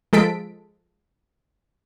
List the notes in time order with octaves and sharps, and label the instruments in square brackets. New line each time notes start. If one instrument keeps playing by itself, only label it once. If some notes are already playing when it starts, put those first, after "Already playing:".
[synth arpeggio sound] F3 G#3 A4 B6 D7